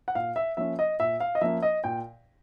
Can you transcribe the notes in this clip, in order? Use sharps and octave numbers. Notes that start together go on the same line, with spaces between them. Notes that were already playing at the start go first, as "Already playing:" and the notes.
F#5
A#2 F5
E5
F3 A#3 C#4 E5
D#5
A#2 E5
F5
D#5
F3 A#3 C#4 E5
D#5
A#2 G5